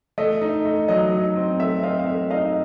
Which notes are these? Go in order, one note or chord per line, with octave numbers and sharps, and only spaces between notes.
A3 D#5
D#4
A3
F#3 D#5
D#4
C4
A3 E5
C4 D#5 F5
F5
A3 E5
D#4 D#5 F5